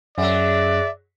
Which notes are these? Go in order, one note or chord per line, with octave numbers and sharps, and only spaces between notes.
F#2 F#3 G#3 D5 E5